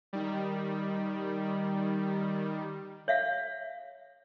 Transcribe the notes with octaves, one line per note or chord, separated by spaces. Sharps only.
D#3 G3
C#5 E5 F5